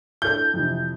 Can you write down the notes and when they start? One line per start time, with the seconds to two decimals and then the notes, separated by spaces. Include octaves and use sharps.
0.22 D4 E4 A4 G6
0.54 F2 C3 E3